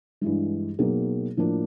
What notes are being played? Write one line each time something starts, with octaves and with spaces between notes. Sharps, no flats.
G2 E3 G#3
B2 F#3 A#3 D#4 G#4
A2 F3 A#3 D4